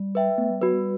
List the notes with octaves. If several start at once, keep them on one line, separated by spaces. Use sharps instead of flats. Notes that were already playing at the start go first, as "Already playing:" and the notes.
Already playing: G3
B4 E5 G5
A3 B3
G3
F#3 F#4 B4
G3